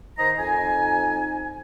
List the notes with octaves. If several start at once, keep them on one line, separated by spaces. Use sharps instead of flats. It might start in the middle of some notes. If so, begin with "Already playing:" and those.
D#3 C5 D#5 A#5
F2 D#4 G#5